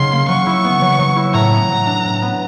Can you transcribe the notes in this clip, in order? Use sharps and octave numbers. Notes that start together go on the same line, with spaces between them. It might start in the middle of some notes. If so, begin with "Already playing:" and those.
Already playing: C#3 F#3 D#4 C6
A#3
F#3 C#6
E4
B3
F#3
F#3
E4
A2 A#5
B3
F#3
D4
A2
B3